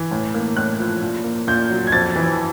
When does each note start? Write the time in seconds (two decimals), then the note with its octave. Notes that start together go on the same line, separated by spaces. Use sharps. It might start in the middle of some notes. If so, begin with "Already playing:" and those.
Already playing: E3
0.11 A2
0.34 A#3
0.57 A2 F#6
0.79 F3
1.02 A#2
1.24 A#3
1.48 A#2 G6
1.71 F#3
1.87 G#6
1.92 F2 A6
2.16 E3